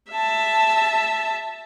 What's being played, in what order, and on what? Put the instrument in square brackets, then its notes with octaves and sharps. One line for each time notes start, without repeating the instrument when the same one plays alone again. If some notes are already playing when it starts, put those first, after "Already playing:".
[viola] E5 A5